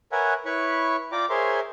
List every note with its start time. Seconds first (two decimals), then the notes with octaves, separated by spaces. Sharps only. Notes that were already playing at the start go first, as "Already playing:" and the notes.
0.12 A#4 B4 C#5 E5 F#5 G#5
0.45 E4 B4 C#5 B5 C#6
1.12 F4 D5 G5 A#5 D6
1.30 G#4 A#4 C5 C#5 E5 C6